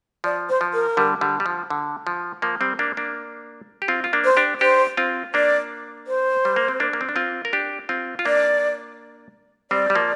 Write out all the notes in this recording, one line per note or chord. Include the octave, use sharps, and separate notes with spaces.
F3 D5
C5
F3
A#4
D3 G3
D3 G3
G3
F3
D3
F3
F3 A#3
G3 C4
A#3 D4
A#3 D4
G4
C4 F4
F4
A#3 D4
C5
D4 G4
D4 G4 C5
C4 F4
A#3 D4 D5
C5
G3
A#3
C4
A#3 D4
A#3
C4
D4
C4 F4
A#4
D4 G4
C4 F4
F4
A#3 D4 D5
G3 C4 D5
G3
F3 A#3